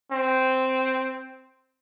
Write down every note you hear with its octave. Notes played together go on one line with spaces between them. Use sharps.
C4